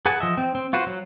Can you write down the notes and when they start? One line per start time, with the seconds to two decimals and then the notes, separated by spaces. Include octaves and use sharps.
0.06 G#4 B4 F#5 G#5 A5
0.20 F3 D#5 E5
0.37 C4
0.55 C4
0.73 F4 F#4 B4 C5
0.87 F#3